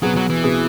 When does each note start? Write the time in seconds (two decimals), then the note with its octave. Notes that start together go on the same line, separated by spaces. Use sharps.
0.02 B2 F#3 B3 G#4
0.16 F#3
0.30 E3
0.43 B2 B3 G#4